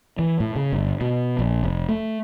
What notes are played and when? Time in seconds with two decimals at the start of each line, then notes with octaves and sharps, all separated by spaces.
0.19 E3
0.40 A2
0.56 C#3
0.73 G1
1.01 B2
1.39 A#1
1.64 F1
1.89 A3